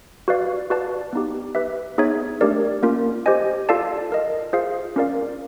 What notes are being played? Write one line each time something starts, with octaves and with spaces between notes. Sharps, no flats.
F#4 B4 D5 F5
F#4 B4 D5 F5 A5
B3 D#4 G4
G4 B4 E5
B3 D#4 G#4 C#5 E5
A3 D4 G4 A#4 D5
A#3 C#4 F4 A#4
G4 C5 D#5 G#5
F4 A4 D5 F5 A5
F4 A#4 D#5
F4 G#4 C5 F5
C#4 F4 A#4 D5 F5